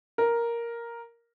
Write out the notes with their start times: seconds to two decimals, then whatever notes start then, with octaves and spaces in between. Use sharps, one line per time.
0.18 A#4